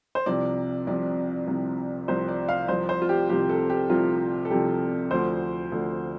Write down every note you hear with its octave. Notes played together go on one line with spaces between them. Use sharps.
C5
C2 C3 F3 D5
C2 C3 F3 D5
C2 C3 F3
C2 C3 F3 C5
D5
F5
C2 C3 F3 C5
C5
F4
G4
C2 C3 F3 G4
A4
G4
C2 C3 F3 F4
A4
C2 C3 F3 G4
D2 D3 F3 C5
D2 D3 F3